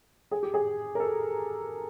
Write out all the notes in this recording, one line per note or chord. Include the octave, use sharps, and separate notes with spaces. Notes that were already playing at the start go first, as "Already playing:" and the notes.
G#4
G4
G#4
A#4
A4